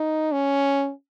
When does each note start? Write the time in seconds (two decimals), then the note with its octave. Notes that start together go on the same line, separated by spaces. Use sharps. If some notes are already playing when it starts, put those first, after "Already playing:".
Already playing: D#4
0.32 C#4